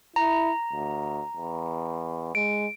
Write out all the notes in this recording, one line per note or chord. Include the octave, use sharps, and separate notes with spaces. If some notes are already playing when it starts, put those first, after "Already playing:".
E4 A#5
D2
E2
G#3 D7